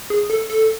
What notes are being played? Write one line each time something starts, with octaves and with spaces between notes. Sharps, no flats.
G#4
A4
A4